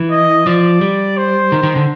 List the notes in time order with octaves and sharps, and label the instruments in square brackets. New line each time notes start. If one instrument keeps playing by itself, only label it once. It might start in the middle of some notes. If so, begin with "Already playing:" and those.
Already playing: [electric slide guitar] E3
[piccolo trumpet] D#5
[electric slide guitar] F3 [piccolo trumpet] D5
[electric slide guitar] G3
[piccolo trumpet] C5
[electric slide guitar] D#3
D#3
D3